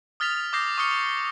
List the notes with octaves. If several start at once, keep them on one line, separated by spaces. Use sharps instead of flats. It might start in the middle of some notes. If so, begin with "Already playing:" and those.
D#6 F6 A6 B6 F7
D6 D#6 G6 A#6 C7
C#6 D#6 F6 C#7 G7